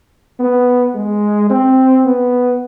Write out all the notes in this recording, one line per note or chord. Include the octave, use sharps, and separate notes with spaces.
B3
G#3
C4
B3